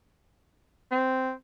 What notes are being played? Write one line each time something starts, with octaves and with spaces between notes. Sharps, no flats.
C4